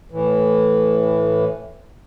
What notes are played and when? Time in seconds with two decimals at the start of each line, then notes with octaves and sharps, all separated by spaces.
0.11 A2 E3